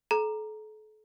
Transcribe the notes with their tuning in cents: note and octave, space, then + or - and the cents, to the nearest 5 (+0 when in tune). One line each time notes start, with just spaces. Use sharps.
A4 -40 A#5 +0